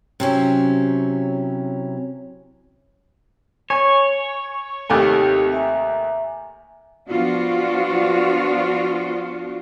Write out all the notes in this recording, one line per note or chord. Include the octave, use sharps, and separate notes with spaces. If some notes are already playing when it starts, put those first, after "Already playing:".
C3 F#3 C#4 E4
C#5 G#5
D#2 C3 A3 C4 D#4 G4
E5 G#5 A#5
F3 B3 D4 F4 F#4